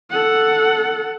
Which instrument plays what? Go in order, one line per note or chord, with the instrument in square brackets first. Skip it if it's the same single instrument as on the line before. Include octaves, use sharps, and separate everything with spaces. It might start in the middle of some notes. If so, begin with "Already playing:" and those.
[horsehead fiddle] A4 F#5